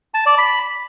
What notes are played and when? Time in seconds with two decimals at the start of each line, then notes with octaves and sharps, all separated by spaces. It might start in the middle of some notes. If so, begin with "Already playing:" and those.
0.14 A5
0.26 D5
0.38 B5